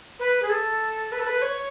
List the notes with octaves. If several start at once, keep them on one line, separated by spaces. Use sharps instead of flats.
B4
G#4
A4
B4
A4
B4
C#5